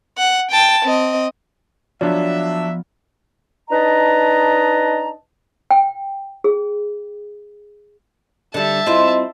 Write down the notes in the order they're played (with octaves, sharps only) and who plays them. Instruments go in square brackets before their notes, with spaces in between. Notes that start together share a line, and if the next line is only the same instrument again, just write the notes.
[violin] F#5
G5 A5
C4 D#5
[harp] F3 B3 F4 [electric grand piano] F#3 D4 [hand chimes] D5 [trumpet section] E5
[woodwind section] D4 D#4 B4 D#5 A5 A#5
[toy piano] G5
G#4
[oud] D3 G3 [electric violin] E5 A5
[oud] C4 E4 F4 [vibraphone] D#5 C6